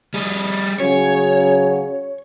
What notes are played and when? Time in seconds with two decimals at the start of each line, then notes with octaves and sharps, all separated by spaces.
0.14 G3 G#4
0.80 C#3 F#3 C#4 C#5